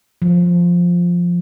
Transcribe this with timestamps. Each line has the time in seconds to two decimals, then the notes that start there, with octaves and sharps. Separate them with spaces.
0.22 F3